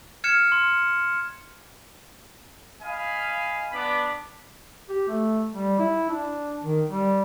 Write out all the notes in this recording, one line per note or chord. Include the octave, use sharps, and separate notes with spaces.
F6 G#6 C#7 E7
C6
D#5 F5 G#5 B5
B3 D4 B5 D6
G4
A3
G3
E4
D4
D#3
G3